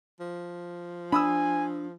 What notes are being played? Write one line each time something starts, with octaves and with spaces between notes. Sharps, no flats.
F3
D4 G#5 B5 D#6 E6